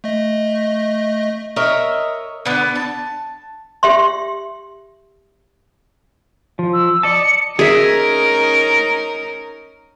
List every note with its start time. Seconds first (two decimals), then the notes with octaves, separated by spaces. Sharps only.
0.04 A3 D#5
1.56 A#4 C#5 D#5 E5
2.45 D3 B3
2.75 A5
3.83 G4 E5 C6
6.59 F3
6.73 E6
7.03 D5 D#5 A5 C#7
7.23 C#7
7.59 C#4 D#4 G#4 A#4 E5